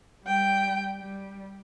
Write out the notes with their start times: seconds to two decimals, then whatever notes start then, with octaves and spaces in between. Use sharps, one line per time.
0.24 G3 G5
1.00 G3